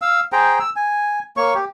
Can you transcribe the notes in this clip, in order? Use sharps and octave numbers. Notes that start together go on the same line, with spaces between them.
F5 E6
G#4 C5 G5 A#5
E6
G#5
A#3 C#5 C#6
G4